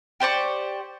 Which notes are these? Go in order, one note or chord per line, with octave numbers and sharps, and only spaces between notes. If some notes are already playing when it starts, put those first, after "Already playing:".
G4 C5 D5 C#6